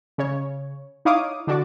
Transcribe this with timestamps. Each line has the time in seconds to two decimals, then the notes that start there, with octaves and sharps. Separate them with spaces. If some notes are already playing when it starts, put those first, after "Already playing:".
0.18 C#3 C#5
1.05 D#4 E4 C#5 F5 D6 D#6
1.47 D3 D4 F#4 D5